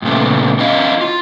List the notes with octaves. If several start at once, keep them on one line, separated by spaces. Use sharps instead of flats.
G2 A#2 C#3 A3 B3
C#4 E4 D#5 F5
F4